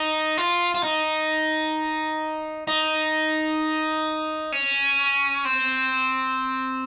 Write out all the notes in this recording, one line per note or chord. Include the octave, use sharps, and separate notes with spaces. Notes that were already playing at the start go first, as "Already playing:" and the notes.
Already playing: D#4
F4
F4
D#4
D#4
C#4
C4